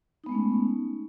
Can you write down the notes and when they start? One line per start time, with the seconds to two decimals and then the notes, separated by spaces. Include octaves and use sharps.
0.24 D#4
0.26 B3
0.29 G#3
0.32 A3
0.35 C#4